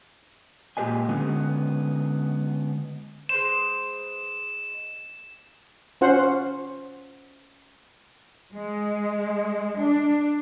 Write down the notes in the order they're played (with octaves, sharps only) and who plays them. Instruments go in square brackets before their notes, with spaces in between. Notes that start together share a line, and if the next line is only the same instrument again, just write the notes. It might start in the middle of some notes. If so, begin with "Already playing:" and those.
[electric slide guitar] A#2 G#3 G4 B4 D#5 G#5
D3 G#3 B3 C#4
[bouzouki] G#3 B4 C5 [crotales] E7
[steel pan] C#4 F4 C5 F#5
[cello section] G#3
D4